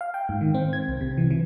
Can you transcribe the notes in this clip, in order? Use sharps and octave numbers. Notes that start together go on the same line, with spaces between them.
F5
G5
G#2
D#3
C4
G#6
C2
C3
E3
E3